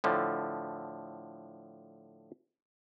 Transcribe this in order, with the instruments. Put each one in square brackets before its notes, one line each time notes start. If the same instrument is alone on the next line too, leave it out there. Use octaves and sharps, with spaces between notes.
[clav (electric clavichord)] A2 D3 F3